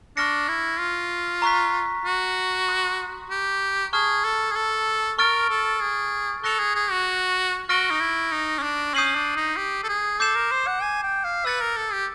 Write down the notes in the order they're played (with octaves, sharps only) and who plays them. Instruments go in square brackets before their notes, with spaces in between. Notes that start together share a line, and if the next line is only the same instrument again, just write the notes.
[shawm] D4 [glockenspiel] C#6 F6 A#6 C#7
[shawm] E4
F4
[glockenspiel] A#5 C#6 F#6 B6
[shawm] F#4
[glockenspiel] C6 D#6 F#6
[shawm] G4
[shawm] G#4 [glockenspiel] A5 C#6 F6
[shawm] A4
G#4
A4
[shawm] A#4 [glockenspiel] C#6 F6 A6 D7
[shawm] A4
G#4
[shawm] A4 [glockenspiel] C#6 F#6 A#6 C#7 F7
[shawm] G#4
G#4
F#4
[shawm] F#4 [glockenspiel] C#6 F6 A#6 D7 G7
[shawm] D#4
E4
D#4
C#4
D4
[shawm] C#4 [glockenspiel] D#6 G6 C7 D#7 F#7
[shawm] D4
D#4
G4
A4
G#4
[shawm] A4 [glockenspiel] D6 G6 C7 E7
[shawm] A#4
C5
F#5
G#5
G5
F5
[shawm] B4 [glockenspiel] E6 A6 C#7
[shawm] A#4
A4
G4